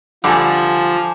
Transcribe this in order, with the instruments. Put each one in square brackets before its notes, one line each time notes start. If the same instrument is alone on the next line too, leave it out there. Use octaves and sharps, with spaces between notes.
[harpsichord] D3 G3 [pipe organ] F3 [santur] G#5 A5 D6